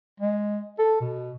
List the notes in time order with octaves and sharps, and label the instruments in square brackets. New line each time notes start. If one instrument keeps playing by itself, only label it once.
[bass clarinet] G#3
A4
B2